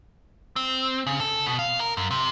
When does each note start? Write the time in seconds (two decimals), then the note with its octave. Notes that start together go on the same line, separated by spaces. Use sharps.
0.56 C4
1.07 C#3
1.20 A4
1.46 B2
1.59 F5
1.80 A#4
1.97 F#2
2.11 C3